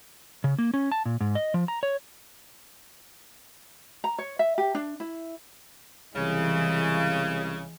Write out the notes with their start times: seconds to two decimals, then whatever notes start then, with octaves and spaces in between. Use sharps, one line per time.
0.44 C#3
0.58 A#3
0.74 C#4
0.92 A5
1.06 A#2
1.21 G#2
1.35 D#5
1.54 F3
1.68 A#5
1.83 C#5
4.04 A#5
4.18 C#5
4.39 E5
4.58 G4
4.75 D4
5.00 E4
6.16 C2 C#3 E3 G#3